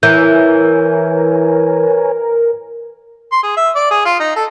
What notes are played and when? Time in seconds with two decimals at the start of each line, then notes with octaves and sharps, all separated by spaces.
0.03 E3 A#4 B4 C#5 G#5 G6
3.32 C6
3.43 G#4
3.57 E5
3.75 D5
3.91 G#4
4.05 F4
4.19 D#4
4.36 A4